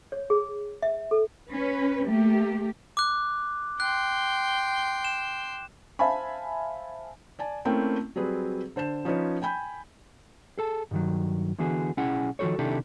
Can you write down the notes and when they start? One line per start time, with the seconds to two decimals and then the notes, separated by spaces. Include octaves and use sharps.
0.12 C#5
0.30 G#4
0.82 E5
1.11 A4
1.48 C#4 B4
2.06 A3 A#3 G4
2.97 D6 F#6
3.80 G5 C6 F#6
5.05 E7
5.99 C5 E5 F5 G#5 A5 B5
7.39 D5 G#5 A5
7.65 A3 A#3 C4 C#4 E4 G5
8.16 F#3 G3 C4 G#4 B4
8.76 D3 C5 A5 E7
9.05 F3 C#4 D#4 F4 B4 C#5
9.42 G5 G#5 B5 G6
10.58 G#4 A4 A5
10.91 G2 D#3 F#3
11.59 D3 E3 B3 F#4 G#4
11.97 B1 C#4 E4 G#4 F#5
12.39 D#3 F3 B3 F#4 A4 C#5
12.59 C3 D#3 D4 E4 G4 A4